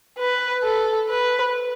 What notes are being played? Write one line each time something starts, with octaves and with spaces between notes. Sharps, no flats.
B4
A4
B4